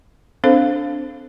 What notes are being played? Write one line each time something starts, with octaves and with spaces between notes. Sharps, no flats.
C4 D4 A4 C5 F5